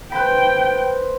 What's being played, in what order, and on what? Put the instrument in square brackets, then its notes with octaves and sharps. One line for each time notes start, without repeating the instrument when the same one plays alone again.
[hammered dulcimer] B4 C5 B5 [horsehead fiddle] G5